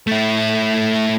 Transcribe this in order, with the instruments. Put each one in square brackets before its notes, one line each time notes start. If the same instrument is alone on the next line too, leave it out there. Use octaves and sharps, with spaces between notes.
[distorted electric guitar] A3 E4